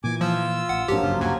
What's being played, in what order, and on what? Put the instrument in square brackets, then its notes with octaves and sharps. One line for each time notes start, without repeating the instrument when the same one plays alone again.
[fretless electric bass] A#2 E3 [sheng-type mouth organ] G#5 D6
[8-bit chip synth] F3 [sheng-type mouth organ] F4 E6
[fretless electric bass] A1 [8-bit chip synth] F#5
[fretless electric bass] G#1 G#2 D4 [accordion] F3 F#3 A#3 [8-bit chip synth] G4
[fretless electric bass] G1 C#2 F#2 [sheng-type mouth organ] F4
[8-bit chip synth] D#2 [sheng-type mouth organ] F#4 G#5